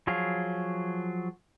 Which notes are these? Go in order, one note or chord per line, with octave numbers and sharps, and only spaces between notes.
F3 F#3 G#4 F5